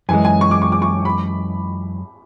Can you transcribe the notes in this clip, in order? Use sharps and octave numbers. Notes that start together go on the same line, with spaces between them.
F#2 E3 G#3 G#5
G#5
C#6
D6
C#6
D6
C#6
B5